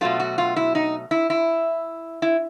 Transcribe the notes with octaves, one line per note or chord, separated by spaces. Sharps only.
B2 F#3 A3 F4
F#4
F4
E4
D#4
E4
E4
E4